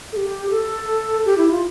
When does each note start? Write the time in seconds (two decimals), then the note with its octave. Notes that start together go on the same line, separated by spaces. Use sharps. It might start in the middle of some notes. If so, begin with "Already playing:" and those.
0.12 A4
0.17 G4
0.50 A4
1.26 G4
1.38 E4
1.51 F4